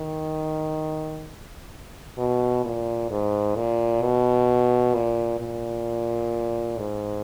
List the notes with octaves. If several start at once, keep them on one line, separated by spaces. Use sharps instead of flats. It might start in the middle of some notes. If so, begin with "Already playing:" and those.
Already playing: D#3
B2
A#2
G#2
A#2
B2
A#2
A#2
G#2